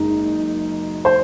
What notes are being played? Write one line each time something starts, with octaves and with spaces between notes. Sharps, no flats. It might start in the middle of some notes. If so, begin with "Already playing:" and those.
Already playing: F#1 F#2 D#3 G#3 D#4
C5